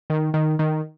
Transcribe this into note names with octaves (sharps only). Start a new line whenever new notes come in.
D#3
D#3
D#3